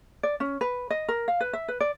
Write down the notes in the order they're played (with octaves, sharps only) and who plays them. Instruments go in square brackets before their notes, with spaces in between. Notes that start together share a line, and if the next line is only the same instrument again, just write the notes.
[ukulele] D5
C#4
B4
D#5
A#4
F5
B4
E5
B4
D5